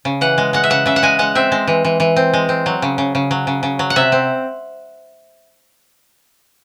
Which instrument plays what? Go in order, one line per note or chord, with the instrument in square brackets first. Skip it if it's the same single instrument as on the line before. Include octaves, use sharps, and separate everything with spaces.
[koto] C#3
E3 F#5
G#3
G#3 F#5
E5
C#3 F#5
C#3 E5
F#5
G#3 G#5
G#3 F#5
C4 E5
G#3
E3
E3
E3
C4
G#3
C4
F#3
C#3
C#3
C#3
F#3
C#3
C#3
F#3
F#5
C3 E5
C4